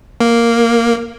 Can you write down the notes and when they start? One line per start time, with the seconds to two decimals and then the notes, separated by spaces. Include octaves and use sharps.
0.20 A#3